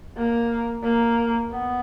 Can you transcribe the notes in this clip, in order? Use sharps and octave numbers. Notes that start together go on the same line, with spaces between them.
A#3
A#3
B3